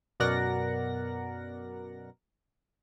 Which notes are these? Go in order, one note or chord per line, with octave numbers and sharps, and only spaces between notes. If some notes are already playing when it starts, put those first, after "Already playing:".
F#2 B2 A#4 D5 F#5 A#6